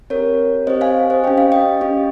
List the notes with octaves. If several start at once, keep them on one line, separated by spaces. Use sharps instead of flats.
C4 G4 A#4 C#5
C4 G4 C5 D#5
F5 G#5
C5 D#5
C#4 G4 G5
F5
D#5 G5
C#4 G4